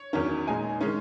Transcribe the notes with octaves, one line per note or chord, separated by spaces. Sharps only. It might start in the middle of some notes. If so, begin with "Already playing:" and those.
Already playing: C#5
E2 D#3 F#3 C#4
A#2 G#3 D#4 G#5
D#3 G#3 C#4